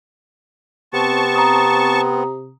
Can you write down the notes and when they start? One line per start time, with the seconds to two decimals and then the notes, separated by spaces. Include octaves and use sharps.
0.93 C3 B3 C4 A5 C#6
1.36 A#5 D#6